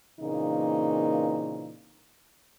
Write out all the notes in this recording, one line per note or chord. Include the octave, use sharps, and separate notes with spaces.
A#2 C#3 E3 A#3 C4 D#4